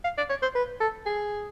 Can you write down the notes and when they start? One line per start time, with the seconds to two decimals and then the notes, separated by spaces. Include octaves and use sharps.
0.04 F5
0.18 D5
0.30 C#5
0.42 C5
0.55 B4
0.80 A4
1.06 G#4